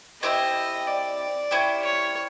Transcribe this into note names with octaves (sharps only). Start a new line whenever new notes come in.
C4 E4 G4 C5 D#5
D5
C#4 E4 G4 C5
C#5